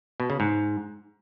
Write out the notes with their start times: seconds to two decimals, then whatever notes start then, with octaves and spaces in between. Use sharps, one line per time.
0.20 B2
0.30 C#3
0.40 G#2